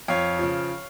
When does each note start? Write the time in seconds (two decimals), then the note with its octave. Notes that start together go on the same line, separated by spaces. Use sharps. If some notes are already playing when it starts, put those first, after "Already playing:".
0.08 F2 C#5 F5
0.39 C#3 F3